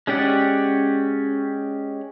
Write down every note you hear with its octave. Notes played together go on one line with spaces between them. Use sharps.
G#3 C#4 G4 D5 F#5